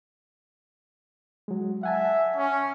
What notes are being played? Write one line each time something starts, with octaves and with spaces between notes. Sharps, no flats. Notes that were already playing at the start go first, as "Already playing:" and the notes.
F#3 G#3
E5 F#5 G#5 A5
C#4